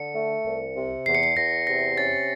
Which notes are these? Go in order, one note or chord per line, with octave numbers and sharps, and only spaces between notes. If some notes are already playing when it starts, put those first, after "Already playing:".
Already playing: D3 C#7
A3
C2
C3
E2 C7
C#7
C7
E2 A#6
C3 A#6
C#4 A6